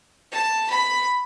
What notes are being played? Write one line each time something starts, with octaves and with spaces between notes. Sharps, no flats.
A5
B5